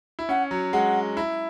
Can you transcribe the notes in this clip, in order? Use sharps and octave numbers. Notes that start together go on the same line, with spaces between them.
E4
C#4 F#5
F#3
G#3 F#5
E4